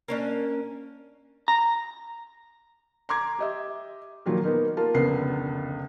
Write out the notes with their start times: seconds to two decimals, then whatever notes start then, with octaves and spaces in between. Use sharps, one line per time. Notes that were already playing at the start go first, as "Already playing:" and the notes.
0.08 A#3 C#4 D4
1.48 A#5
3.09 A#5 C6 D6 G#6
3.39 G4 D#5 E5
4.26 A#2 D#3 F3 F#3 A#3 F4
4.44 A#3 B3 D#4 A#4
4.77 A#3 F4 A#4 A5
4.94 F1 C#2 D3 B3 A#4 C7